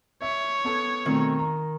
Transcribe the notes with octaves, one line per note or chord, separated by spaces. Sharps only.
C#5 E5
B3 A4
B2 D#3 A3 C4
A#5